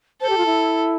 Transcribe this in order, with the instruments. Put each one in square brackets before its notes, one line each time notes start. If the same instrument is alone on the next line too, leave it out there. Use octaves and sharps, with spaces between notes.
[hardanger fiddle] A4 [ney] C5
[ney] G4
F4
E4